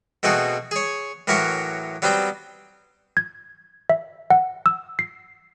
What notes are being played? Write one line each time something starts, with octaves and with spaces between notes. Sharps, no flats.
B2 A3 C4 F#4 G#4
G#4 C#5
A2 E3 F#3 A#4 E5 C#6
F#3 G3 B3 C4 C5
G#6
E5
F#5
E6
C7